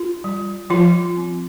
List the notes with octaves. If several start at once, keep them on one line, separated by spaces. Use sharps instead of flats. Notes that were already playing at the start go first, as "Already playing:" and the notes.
Already playing: F4
G3
F3 F4
C4